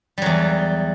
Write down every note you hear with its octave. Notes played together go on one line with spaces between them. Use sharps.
E2 F#3 G3